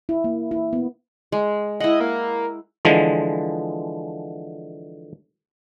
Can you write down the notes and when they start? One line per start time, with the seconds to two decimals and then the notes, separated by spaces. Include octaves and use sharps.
0.09 E4
0.24 A#3
0.51 E4
0.73 B3
1.32 G#3
1.80 E4 D#5 F#5
2.00 A#3
2.85 D3 E3 F3 G#3